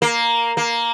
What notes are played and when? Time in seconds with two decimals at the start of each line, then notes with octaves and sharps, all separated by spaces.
0.02 A#3
0.57 A#3